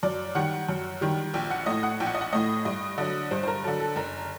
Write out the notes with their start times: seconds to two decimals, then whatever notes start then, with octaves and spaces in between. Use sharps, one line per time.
0.03 F#2 D5
0.35 D#3 G3 F#5
0.69 F#2
1.01 D#3 G3
1.34 A#1 G5
1.50 F#5
1.66 A2 A3 D#5
1.83 F#5
2.00 A#1 G5
2.06 F#5
2.15 D#5
2.21 F#5
2.33 A2 A3 D#5
2.65 G2 D#5
2.98 D3 F#3 D#5
3.31 G2 C5
3.43 C5
3.48 A#4
3.64 D3 F#3 A4
3.80 A4
3.96 F#1 A#4